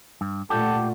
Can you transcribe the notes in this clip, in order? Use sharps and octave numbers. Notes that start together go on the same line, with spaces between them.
G2
A#2 A3 D4 F4 G4 A4 F#5